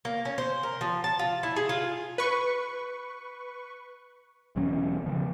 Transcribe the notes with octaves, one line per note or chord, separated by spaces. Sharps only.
A#3
C#4
C5
A#4
F3
A5
F4
E4
G#4
F4
B4 C#6
E1 E2 F#3 C#4
C#3 F3